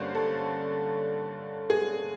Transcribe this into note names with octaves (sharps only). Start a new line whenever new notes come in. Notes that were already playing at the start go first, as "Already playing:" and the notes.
Already playing: G2 D3 A#3 C#4 C5 C#5
A4
G#4